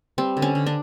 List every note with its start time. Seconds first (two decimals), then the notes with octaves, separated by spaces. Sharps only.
0.18 G3 C4
0.37 D3
0.42 C#4
0.55 D3
0.66 D4